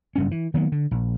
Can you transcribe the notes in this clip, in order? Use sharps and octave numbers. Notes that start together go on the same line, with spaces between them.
F#1 G2 C#4
E3
D#3 F#3 A#3 B3
D3
A#1